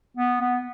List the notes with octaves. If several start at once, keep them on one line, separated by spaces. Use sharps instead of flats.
B3
B3